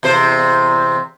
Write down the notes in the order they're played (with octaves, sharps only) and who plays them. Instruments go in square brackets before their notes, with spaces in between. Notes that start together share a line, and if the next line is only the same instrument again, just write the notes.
[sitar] E2 C3 C5